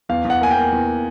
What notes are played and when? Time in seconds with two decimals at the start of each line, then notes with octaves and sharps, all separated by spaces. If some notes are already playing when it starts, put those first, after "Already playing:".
0.09 E2 F5
0.25 E2
0.30 F#5
0.41 A#3 G#5
0.51 G5
0.56 A#3
0.72 E2